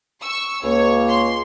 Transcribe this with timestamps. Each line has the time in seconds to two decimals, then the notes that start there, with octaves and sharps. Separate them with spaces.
0.22 C#6 E6
0.62 C#2 A#3 C#5
1.09 C6